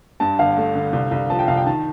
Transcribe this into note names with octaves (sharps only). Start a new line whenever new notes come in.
G2 A5
G1 F5
A3
D3
C2
C2
F3 A5
G5
C2 F5
G5
D#3 A5